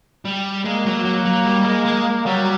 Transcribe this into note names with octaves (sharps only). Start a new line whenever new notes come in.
G3
G#3 A#3
F#3
F#3
F#3
G3
G#3
G#3
F#3 G3